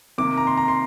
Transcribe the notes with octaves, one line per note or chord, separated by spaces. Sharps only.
C3 D#3 A#3 D6
A#5
C6
A#5
C6